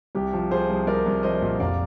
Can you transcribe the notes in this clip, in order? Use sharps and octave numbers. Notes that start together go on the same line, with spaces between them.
C2 G4
F3
F3 G#4 C5
C2
C2 A#4 D5
C2
F3 C5 D#5
A#2
F1 D5 F5